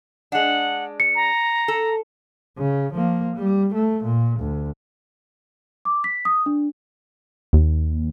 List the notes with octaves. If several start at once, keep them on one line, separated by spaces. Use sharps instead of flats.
G#3 D4 F#5
C#7
A#5
A4
C#3
F3 A#3
G3
A3
A#2
D2
D6
B6
D#6
D4
D#2